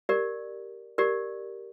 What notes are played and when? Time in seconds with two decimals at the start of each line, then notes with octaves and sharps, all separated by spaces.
0.09 G4 A#4 D5
0.98 G4 A#4 D5